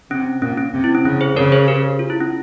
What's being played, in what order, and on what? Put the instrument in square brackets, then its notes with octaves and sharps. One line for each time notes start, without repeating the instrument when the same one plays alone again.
[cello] C3 [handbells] C#4
[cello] A#2 [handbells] C#4
[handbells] C#4
[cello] C3
[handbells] E4
C#4
[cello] C#3 [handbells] C#4
[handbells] G#4 C5
[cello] C#3 [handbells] A#4 C#5
[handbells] G#4 C5
G4 A#4
F4
E4
C#4